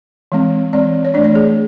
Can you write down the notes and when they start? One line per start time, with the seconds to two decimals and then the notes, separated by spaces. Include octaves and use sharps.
0.32 E3 G#3 C4
0.73 E3 G#3 C4 D5
1.05 C#5
1.14 E3 A3 D4 D5
1.24 C#5
1.35 G#4